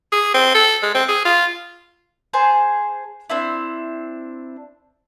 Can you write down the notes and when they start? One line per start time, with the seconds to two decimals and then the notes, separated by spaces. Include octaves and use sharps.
0.12 G#4
0.34 C4
0.55 A4
0.83 G#3
0.95 C4
1.09 G#4
1.25 F4
2.33 G#4 C5 A5
3.30 C4 D4 E4